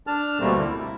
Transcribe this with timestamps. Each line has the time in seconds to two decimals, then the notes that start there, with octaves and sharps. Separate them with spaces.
0.07 D4 A5 F6
0.40 D2 B2 G3 A3 A#3 C4
0.58 E4